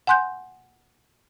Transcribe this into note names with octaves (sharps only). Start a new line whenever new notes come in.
F#5 G#5 C6 F#6 G6